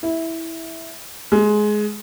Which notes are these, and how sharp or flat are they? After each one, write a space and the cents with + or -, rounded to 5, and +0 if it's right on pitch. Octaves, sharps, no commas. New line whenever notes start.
E4 -10
G#3 +15